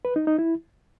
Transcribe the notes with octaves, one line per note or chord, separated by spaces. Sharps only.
B4
D#4
D#4
E4